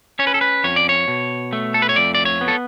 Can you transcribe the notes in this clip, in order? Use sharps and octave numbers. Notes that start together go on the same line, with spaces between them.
C#4 C#5
B4
A4
B4
F2 C#5
D5
C#5
B2
A3
A4
B4
C#5
F2 D5
D5
C#5
B3
A4